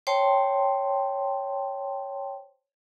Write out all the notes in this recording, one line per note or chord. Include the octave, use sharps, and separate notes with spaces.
C5 C#5 G5 A5 C6